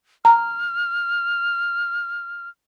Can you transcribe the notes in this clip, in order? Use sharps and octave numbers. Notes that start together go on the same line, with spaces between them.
A#5 F6